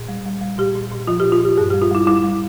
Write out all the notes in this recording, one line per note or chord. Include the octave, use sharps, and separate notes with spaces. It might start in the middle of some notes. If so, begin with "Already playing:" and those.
Already playing: A#2
G3
G3
G3
A#2 G4
A#2
A#2
F3 F4
G4
A#2
F4
A#2 G4
G2 G#4
G4
G3
F4
G3 E4
G3 E4
G3